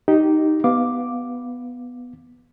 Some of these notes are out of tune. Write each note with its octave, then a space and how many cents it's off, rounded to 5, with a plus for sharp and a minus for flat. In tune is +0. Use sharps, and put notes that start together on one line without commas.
D#4 +0 G4 -15
B3 +0 F5 +0 D6 +0